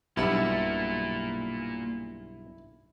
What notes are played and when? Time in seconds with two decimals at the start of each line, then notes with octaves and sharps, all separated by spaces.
0.17 B1 G2 A#2 E4